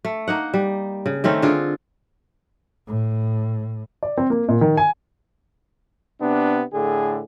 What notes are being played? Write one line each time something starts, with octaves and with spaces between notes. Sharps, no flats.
A3
A#3 D#4 F#5
G3
C#3
D#3 A3 C4 C#4
D3 F4 G#4
A2
D5
C4
A#3
A#2
D#3
G#5
C3 B3 D4
A2 D3 G#4